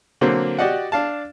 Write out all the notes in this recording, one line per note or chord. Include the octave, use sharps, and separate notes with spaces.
D3 F#3 A#3 C4 C5
F#4 G4 D5 D#5 F#5
D4 F5 A5